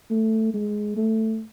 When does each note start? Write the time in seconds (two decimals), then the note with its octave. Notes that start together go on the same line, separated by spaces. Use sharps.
0.11 A3
0.54 G#3
0.96 A3